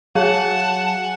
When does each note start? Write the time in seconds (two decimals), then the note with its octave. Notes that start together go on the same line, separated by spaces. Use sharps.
0.15 F#3 G#4 F5 F#5 G#5 A5